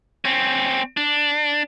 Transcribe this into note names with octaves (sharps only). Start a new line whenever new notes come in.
C4 C#4
D4